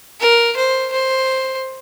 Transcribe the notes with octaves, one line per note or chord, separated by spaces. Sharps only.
A#4
C5
C5